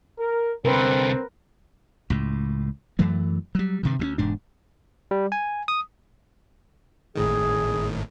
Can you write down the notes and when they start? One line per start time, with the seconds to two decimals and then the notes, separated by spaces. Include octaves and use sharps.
0.18 A#4
0.65 C2 D3 C4 A#4 B4
2.10 C#2 A2
2.99 F#2 E3 F#3 A3
3.55 F#3 G3
3.83 G2 C3 D#3
3.99 D2 G3 C#4
4.18 E1 G#2 D4
5.11 G3
5.32 G#5
5.68 D#6
7.15 G#1 A2 D#3 G#4